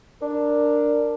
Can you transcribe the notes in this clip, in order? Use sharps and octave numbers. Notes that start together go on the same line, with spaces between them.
D4 A#4